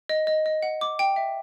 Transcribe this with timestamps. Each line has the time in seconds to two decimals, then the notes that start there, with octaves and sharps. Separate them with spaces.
0.09 D#5
0.27 D#5
0.46 D#5
0.63 F#5
0.81 D6
0.99 G5
1.16 E5